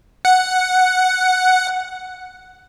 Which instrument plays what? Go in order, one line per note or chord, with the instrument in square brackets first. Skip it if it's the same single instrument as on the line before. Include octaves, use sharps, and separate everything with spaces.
[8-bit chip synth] F#5